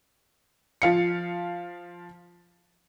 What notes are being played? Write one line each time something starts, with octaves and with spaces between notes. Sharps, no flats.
F3 F5 C#7